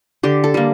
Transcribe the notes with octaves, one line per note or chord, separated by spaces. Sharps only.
D3 G4
A4
G3 A#3